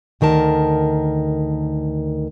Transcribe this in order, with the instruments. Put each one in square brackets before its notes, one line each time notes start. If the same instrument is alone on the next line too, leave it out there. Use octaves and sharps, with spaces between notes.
[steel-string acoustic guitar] D2 D#3 A#4 A5